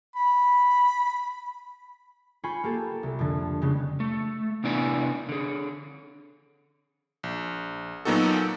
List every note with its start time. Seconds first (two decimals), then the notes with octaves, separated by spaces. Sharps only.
0.16 B5
2.44 F4 C5 G#5 B5 C#6
2.64 A#3 G4 A4
3.03 C2
3.19 F2 D3
3.62 C#3 G#3 B3 C#4
4.00 A3
4.64 C3 B3 D4 E4 D5 G#5
5.29 D3 G#4
7.23 A#1
8.05 A#2 F#3 B3 D#4 F#4 A4